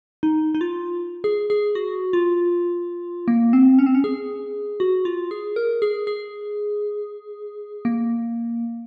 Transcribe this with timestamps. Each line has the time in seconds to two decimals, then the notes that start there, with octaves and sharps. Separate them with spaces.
0.23 D#4
0.55 D#4
0.61 F4
1.24 G#4
1.50 G#4
1.75 F#4
2.13 F4
3.28 A#3
3.53 C4
3.79 C#4
3.86 C4
3.95 C#4
4.04 G#4
4.80 F#4
5.05 F4
5.31 G#4
5.56 A#4
5.82 G#4
6.07 G#4
7.85 A#3